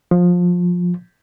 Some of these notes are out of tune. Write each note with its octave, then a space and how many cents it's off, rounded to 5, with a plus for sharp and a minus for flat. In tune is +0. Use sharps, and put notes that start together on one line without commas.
F3 +20